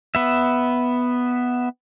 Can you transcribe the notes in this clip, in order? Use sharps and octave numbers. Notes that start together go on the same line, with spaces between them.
B3 E5